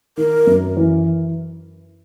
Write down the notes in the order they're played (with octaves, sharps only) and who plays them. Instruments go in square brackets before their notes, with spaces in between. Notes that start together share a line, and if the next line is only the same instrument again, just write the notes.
[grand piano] D#3 [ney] A#4
[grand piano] F#2
E3